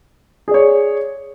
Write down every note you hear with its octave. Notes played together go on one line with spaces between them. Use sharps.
G#4 C#5 D5